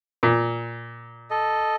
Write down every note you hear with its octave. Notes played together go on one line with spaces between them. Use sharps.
A#2
A4 D#5